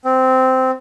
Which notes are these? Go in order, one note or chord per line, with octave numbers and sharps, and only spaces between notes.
C4